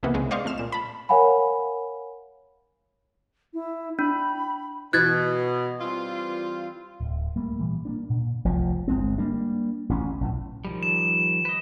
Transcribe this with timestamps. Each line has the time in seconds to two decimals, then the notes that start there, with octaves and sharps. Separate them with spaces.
0.03 C#2 C3 E3 A#3 B3
0.14 C2 C#3 G#3
0.31 C5 D5 D#5 F5 C6 C#6
0.45 F2 A3 F6 E7
0.58 A#2 E7
0.72 A5 B5
1.09 A#4 C#5 F5 F#5 G#5 B5
3.54 E4
3.99 D4 B5
4.93 B2 E3 F#6 G#6 A6
5.80 G3 C4 F4
7.00 D1
7.36 G3 A3 A#3
7.59 A#2 E3 G3
7.85 A#3 B3 D4
8.10 A#2
8.45 F1 C2 F3
8.88 G1 G#3 C4
9.18 G3 A#3 D4
9.89 A1 D2 C#4
10.21 B1 A2
10.65 D#3 F3 G3
10.83 E7
11.45 B4 D#5